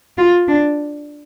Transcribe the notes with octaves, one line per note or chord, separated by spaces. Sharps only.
F4
D4